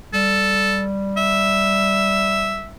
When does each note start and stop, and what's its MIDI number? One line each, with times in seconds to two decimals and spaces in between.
0.13 2.75 55
0.13 0.83 69
1.17 2.70 76